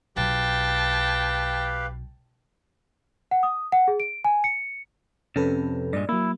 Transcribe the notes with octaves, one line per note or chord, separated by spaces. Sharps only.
B1 G4 B4 F5 G5 A5
F#5
D#6
F#5
G#4
D7
G#5
C#7
F2 C3 C#4 A4 B4
G2 A#2 G#3 D5
F#3 A#3 E4